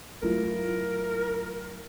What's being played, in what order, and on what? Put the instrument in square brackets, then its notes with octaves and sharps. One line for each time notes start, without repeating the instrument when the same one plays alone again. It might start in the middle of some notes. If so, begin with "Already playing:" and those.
[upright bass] G2 F#3 [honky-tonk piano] A3 E4 F4 [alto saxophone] A#4